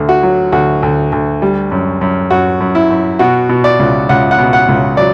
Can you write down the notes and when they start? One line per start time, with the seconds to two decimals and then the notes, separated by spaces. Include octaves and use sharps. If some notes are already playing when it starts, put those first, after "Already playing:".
Already playing: D2 D3
0.09 F#4
0.23 F#3
0.52 D2 F#4
0.83 D2
1.12 D2
1.42 G3
1.72 F#2
2.01 F#2
2.31 F#2 F#4
2.61 F#2
2.75 E4
2.90 F#2
3.19 B2 F#4
3.49 B2
3.64 D5
3.79 C#2
4.09 C#2 F#5
4.31 F#5
4.38 B2
4.53 F#5
4.68 C#2
4.97 F#3 D5